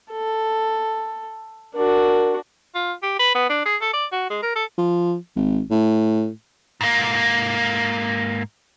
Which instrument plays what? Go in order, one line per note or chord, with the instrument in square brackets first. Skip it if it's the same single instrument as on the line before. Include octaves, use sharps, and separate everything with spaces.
[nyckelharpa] A4
[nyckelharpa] D4 F#4 [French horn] A#4
[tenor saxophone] F4
G4
B4
B3
D4
G#4
A4
D5
F#4
G#3
A#4
A4
[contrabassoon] F3
G#1
A2
[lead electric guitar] G#2 A#3